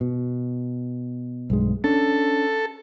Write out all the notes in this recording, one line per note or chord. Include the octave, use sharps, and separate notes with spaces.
B2
B1 G2 G#3
C#4 D4 A4